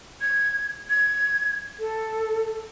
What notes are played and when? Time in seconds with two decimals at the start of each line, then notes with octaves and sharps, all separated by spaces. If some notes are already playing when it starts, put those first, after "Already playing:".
0.21 G#6
0.90 G#6
1.80 A4